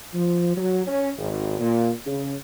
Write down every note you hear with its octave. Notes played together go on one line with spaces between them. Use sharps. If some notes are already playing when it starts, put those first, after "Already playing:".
F3
F#3
C#4
G#1
A#2
C#3